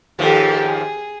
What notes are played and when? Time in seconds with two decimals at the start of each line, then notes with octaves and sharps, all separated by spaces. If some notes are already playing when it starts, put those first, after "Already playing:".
0.19 D#2 G#2 F3 G4 A4
0.66 G#4